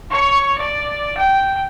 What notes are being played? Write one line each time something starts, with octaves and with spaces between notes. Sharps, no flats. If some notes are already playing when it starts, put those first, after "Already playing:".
C#5 C#6
D5
G5